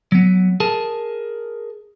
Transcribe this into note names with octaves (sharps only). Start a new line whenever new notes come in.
F#3 B3
G#4 A#4 A5